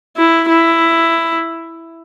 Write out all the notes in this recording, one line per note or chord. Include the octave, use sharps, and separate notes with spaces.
E4
E4